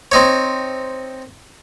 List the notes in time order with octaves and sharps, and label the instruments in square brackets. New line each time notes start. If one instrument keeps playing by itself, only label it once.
[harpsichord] C4 D#4 C#5